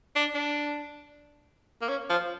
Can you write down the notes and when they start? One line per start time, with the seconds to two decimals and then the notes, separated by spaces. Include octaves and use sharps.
0.15 D4
0.35 D4
1.81 A#3
1.89 C#4
2.10 F3